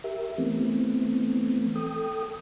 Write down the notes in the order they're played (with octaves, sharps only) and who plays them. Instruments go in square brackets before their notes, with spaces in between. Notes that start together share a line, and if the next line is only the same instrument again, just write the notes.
[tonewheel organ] G4 A#4 E5
E3 A3 B3 C4
A4 G5 D#6